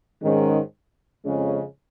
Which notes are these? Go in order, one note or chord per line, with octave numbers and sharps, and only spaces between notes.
G#2 D#3 G#3 C#4
F2 C#3 G#3 C#4